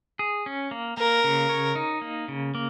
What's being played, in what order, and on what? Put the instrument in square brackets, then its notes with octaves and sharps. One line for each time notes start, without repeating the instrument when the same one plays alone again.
[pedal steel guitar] G#4
C#4
A#3
[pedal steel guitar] A#3 [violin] A#4
[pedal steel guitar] C#3
C#5
D#4
A#3
C#3
A#3